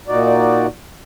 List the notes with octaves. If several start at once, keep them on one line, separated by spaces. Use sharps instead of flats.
A#2 D#4 F#4 D5